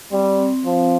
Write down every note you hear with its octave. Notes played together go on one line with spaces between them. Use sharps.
G3 C4
C4
F3 C4